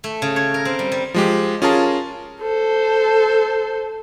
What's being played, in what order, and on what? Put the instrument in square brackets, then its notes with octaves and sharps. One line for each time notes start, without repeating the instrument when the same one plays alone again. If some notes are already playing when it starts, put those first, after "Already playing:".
[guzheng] A3
C#3
C#5
A#4
C4
G3
G3
[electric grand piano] F3 G#3 G4
C#4 F4 G#4 A#4 A5
[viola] A4 C5